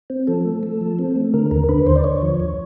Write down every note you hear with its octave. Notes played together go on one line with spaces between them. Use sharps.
C4
F3 A4
A3
A3
F3
C4
A3
D3 A#4
D#2 A#4
D3 B4
D#2 C5
D5
D3 C#5
F3
D#2